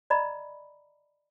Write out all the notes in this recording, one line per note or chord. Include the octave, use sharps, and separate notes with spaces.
D5 D#5 A#5 B5